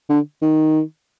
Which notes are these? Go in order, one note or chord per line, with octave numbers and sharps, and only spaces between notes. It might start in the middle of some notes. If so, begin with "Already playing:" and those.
D3
D#3